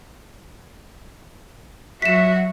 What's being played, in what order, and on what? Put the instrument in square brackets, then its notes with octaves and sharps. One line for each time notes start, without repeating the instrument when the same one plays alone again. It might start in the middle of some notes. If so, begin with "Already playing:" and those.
[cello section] F#3 F#4 [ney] E5 [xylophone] B6 E7